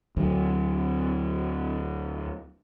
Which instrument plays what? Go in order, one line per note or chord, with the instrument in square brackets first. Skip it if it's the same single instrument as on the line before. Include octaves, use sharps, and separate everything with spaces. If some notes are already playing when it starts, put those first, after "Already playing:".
[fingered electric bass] D2 F#3